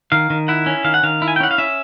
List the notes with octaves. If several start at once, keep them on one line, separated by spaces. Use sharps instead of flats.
D#3 F5
D#3
E4 F#5
C#4
D#3 F5
F#5
D#3 F5
E4
G#5
G5
C#4 F#5
F5
C#4 E5